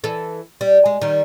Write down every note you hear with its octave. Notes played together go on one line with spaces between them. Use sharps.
E3 A4
G3
G#3
D#3 G3